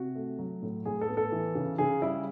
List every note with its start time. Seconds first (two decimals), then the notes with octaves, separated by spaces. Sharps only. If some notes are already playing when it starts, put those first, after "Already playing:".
Already playing: C3 F#4
0.15 A3
0.39 F#3
0.62 A2
0.86 A2 G#4
1.01 A4
1.08 B3
1.17 A4
1.32 E3
1.55 C#3
1.78 C#3 G#4
2.02 G3 E4